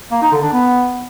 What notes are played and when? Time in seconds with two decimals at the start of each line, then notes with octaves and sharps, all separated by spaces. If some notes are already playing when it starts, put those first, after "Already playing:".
0.11 A#3
0.22 D#4
0.32 D3
0.42 D4
0.53 B3